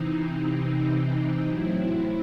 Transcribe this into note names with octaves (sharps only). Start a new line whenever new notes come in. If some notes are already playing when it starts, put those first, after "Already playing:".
Already playing: C3 E3 C4 D#4
A2 F#3 C4 E4